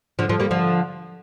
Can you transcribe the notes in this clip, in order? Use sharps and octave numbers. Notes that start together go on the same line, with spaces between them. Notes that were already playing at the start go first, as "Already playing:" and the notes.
D3 F3
D3 F3
G3 A#3
D3 F3